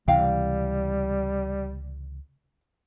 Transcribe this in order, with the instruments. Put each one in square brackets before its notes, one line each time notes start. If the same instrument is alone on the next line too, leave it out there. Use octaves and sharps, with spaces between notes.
[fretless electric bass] C#2 C3 E3 [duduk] G3 [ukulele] F5 G5